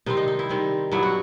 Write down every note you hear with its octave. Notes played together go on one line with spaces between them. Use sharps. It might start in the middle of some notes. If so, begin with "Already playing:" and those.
C3 D#3 G3 C4 D#4
D#4
D#4
E4
C3 D#3 G3 C4
G2 F#3 B3 E4
F#4